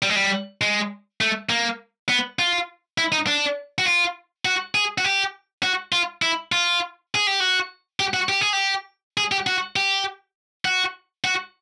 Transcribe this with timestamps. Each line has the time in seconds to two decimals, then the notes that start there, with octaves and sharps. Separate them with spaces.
0.02 G3
0.09 G#3
0.16 G3
0.61 G#3
1.21 A3
1.49 A#3
2.09 B3
2.39 F4
2.98 E4
3.12 D#4
3.27 D4
3.78 F#4
3.86 F4
4.45 F#4
4.75 G#4
4.98 F#4
5.04 G4
5.63 F#4
5.92 F4
6.22 E4
6.52 F4
7.15 G#4
7.27 G4
7.40 F#4
8.00 G4
8.14 F#4
8.29 G4
8.41 G#4
8.53 G4
9.17 G#4
9.32 G4
9.47 F#4
9.76 G4
10.65 F#4
11.24 F#4